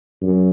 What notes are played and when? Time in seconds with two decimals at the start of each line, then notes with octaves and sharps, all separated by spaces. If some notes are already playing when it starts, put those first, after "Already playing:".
0.22 F#2